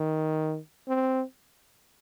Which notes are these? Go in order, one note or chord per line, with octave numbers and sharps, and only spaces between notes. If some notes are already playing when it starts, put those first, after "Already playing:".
Already playing: D#3
C4